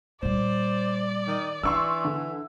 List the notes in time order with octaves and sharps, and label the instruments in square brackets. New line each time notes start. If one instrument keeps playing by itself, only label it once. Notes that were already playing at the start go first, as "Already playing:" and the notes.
[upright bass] A#2 G3 [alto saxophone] C5 [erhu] D5
[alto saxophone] D#3
[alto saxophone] E3 [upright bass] D4 [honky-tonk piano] C6 C#6 E6
[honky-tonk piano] D3